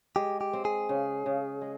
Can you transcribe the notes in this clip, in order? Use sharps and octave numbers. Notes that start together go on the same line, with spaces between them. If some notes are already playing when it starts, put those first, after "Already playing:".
G#3 G4
G4
C4
G#4
C#3
C#3
G#3